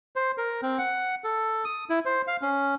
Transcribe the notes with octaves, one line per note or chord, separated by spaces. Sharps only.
C5
A#4
C4
F#5
A4
D#6
E4
C5
F5
C#4